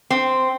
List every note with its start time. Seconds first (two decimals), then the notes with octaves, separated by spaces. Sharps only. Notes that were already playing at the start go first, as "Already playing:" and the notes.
0.10 C4